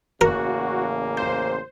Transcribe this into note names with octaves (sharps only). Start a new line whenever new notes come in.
A1 C#3 A#3 F#4 A#4
C5